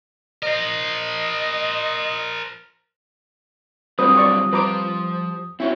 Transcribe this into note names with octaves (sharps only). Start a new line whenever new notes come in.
A#4 C5 D#5
D3 F#3 G3 C4 F4 B4 D#6
D5 C#6
F3 B4 C5 A#5 D6
C4 C#4 E4 F#4